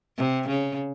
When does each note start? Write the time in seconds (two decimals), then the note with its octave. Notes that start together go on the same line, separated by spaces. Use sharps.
0.17 C3
0.48 C#3